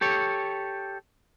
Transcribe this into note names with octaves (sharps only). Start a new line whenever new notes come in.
G4 A4 C#5